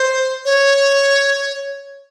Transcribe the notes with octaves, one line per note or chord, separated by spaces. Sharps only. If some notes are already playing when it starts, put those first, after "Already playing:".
Already playing: C5
C#5